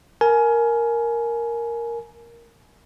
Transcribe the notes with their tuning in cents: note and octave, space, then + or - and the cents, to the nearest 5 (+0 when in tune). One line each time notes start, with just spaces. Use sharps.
A#4 +0 G#5 +25